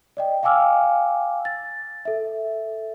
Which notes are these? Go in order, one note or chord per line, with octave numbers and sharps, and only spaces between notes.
D5 D#5 G5
F5 G5 G#5 D6 E6 F6
A6
A4 E5